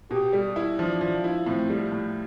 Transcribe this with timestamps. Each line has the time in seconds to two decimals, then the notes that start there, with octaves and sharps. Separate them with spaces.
0.11 B2 G4
0.33 G3
0.56 E4
0.79 F3 D4
1.01 F3
1.24 E4
1.46 A2 C4
1.70 G3
1.92 A2